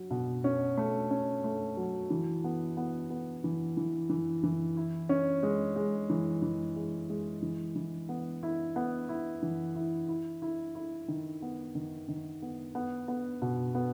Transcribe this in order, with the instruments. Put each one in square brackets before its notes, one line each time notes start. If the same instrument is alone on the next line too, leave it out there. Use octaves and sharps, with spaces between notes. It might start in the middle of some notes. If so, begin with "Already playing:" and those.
Already playing: [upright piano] F#3
B2
C#4
A3
C#4
A3
F#3
E3
B3
B3
B3
E3
E3
E3
E3
E4
C#4
G#3
G#3
E3
E3
G#3
G#3
E3
E3
B3
E4
B3
E4
E3
E4
E4
E4
E4
D#3
B3
D#3
D#3
B3
B3
B3
B2
B3